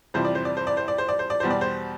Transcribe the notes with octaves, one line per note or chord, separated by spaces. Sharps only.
F2 C3 E3 G3 C5
D5
C5
D5
C5
D5
C5
D5
C5
D5
C5
D5
E2 B2 G3 C5
D5
C5